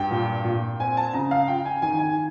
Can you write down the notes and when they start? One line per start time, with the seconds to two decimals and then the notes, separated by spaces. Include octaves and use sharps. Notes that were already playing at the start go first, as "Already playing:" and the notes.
Already playing: G2 G5
0.11 A#2
0.45 A#2
0.80 C4 G#5
0.97 A5
1.13 C#3 A#5
1.31 F5
1.48 F4 G5
1.65 G#5
1.82 D#3 G#5
1.99 G#5